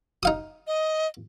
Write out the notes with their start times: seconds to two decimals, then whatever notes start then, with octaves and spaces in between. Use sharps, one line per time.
0.23 D#4 F5 D#6
0.67 D#5